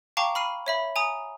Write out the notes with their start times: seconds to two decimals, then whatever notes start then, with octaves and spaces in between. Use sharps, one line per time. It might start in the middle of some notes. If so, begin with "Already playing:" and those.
0.17 F5 G5 A5 A#5 C#6 D6
0.35 B5 F6 C7 D#7
0.66 C#5 E5 B5
0.96 G#5 A#5 D#6